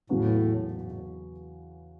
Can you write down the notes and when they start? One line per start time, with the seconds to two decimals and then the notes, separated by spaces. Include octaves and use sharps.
0.10 E2 A2 C#3 F#3 B3 F#4
0.71 G#2
0.81 G#2
0.92 A2